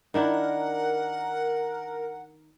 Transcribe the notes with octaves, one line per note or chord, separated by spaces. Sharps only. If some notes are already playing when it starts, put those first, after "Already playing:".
D#3 D4 E4 A#4 F#5